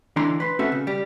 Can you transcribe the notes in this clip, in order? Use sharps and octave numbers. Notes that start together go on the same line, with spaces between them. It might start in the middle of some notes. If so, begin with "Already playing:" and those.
D3 E3 D4 E4 A#5 C6
B4 C6
C4 C#4 F#4 A4 B4 E5
C#3
G3 G4